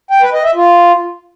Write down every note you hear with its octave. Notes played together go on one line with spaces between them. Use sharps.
G5
B4
D#5
E5
F4